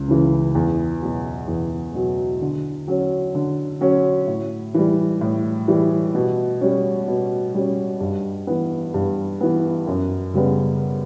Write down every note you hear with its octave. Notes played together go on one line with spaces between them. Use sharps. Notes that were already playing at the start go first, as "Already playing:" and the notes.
Already playing: C#2
C#3 E3
E2
B2 F#3
E2
B2 F#3
D3
F#3 C#4
D3
F#3 C#4
A2
E3 G3
A2
E3 G3
B2
G3 C#4
B2
G3 C#4
G2
E3 B3
G2
E3 B3
F#2
C#3 G3 B3